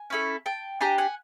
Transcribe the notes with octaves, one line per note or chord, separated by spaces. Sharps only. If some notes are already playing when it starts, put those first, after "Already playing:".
Already playing: G#5
C#4 E4 A4
G5 A5
D4 G4 G#5 A#5
F#5 G#5